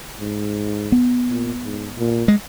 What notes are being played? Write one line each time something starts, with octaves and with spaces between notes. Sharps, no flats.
G#2
B3
A#2
G#2
A#2
G#3